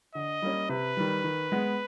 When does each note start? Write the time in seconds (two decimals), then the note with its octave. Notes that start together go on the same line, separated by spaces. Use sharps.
0.15 D3 D#5
0.42 G3 A#3 C#4
0.69 C3 B4
0.97 D#3 G3
1.24 D#3
1.52 G#3 B3